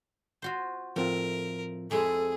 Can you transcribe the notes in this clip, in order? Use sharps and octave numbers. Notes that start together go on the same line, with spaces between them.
F4 F#4 C5
A2 F3 C4 F4 A#4
F2 G#3 E4 G#4 A4